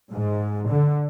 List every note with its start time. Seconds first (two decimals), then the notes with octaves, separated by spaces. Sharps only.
0.12 G#2
0.71 D3